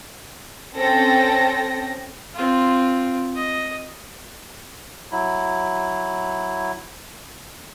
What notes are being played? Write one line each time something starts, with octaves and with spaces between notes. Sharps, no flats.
C4 C#4 A4 G5 A#6
C4 F4
D#5
F#3 E4